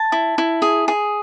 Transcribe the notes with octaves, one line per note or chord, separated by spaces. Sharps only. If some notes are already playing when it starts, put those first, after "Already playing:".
Already playing: A5
E4
E4
G#4
G#4